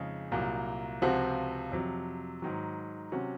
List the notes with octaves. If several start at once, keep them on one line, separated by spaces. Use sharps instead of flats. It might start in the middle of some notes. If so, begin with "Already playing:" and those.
Already playing: F2 C#3 G#3 D#4
C2 A#2 F#3 A#3
C#2 C3 F3 C4 F#4
F2 C3 F#3
G#2 D#3 F#3
C3 F#3 C#4 F#4